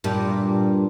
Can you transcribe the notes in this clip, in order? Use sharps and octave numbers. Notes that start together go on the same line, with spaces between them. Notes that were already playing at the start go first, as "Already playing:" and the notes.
G2 A#2 G3